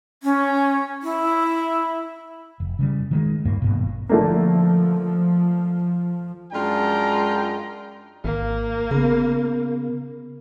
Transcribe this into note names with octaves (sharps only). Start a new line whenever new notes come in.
C#4
E4
F1
C#3 F3 G3
D#3 F#3 G#3
D1 G2 A#3
G#1 G2 B2
D3 F3 A3 A#3
F#2 G#3 D4 F4 G5 A#5
G#1 A#3
C#3 B3 A#4